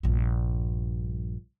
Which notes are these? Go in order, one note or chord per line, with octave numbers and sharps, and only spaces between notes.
A#1 G2